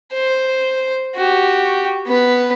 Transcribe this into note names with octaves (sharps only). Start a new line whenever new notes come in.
C5
F#4 G4
B3 B4